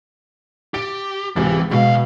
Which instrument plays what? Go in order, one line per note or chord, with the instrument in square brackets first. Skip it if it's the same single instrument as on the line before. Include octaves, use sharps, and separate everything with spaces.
[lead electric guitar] G4 [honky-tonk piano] A6 D7
[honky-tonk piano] C#2 C3 A6 [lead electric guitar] E3
[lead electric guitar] D2 F5 [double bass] B2 [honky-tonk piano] G#3